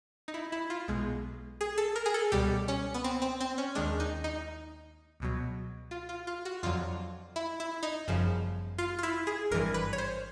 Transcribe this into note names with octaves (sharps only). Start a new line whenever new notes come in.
D#4
E4
E4
F4
B1 B2 G#3
G#4
A4
A#4
G#4
A4
C#2 B2 G3 G4
C#4
B3
C4
C4
C4
C#4
D#2 D#3 G#3 D4
D#4
D#4
C#2 B2 F#3
F4
F4
F4
F#4
F2 D3 F#3 F4
E4
E4
D#4
G1 F#2 C#3 F3
F4
F4
E4
G#4
G#1 G2 E3 A#4
B4
C#5
C5